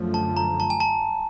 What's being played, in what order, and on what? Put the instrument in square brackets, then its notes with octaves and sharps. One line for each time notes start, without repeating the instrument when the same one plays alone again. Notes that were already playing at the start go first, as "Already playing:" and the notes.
Already playing: [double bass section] F#2 D3 F3 A3
[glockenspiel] A5
A#5
A5
G#5
A5